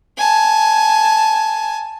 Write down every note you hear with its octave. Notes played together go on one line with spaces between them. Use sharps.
G#5 A5